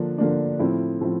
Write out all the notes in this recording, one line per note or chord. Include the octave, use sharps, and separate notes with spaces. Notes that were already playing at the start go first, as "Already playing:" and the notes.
Already playing: D3 F3 A#3 D4
D3 F3 A#3 D4
A2 F3 C4 E4
A2 F3 C4 E4